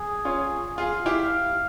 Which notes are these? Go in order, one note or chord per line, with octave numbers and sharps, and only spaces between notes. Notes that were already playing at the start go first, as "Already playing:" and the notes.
Already playing: G#4
C#4 F4
F4 G#4 F5
E4 G4